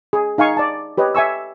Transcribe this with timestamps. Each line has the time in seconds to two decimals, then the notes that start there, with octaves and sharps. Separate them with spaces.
0.13 G#4
0.38 D#4 F5 G#5 C#6
0.57 D5 A5
0.98 G4 B4 C#5 D#5
1.15 E5 G#5 C#6 E6